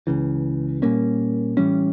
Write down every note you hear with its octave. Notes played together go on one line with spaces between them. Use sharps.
C#2 C#3 E3
A#2 G3 A#3 C#4
A2 E3 G3 C#4